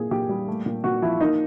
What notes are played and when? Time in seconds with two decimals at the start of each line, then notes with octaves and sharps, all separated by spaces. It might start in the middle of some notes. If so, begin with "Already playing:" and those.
Already playing: A#2 E3 A#3 G#4
0.11 A#2 G4
0.29 G3
0.48 A3
0.66 A#2
0.84 A#2 F#4
1.02 F3 E4
1.21 A#3 D#4